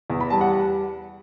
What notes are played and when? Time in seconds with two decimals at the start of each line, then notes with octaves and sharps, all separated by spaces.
0.10 E2
0.20 B5
0.30 G3 A5
0.41 F#5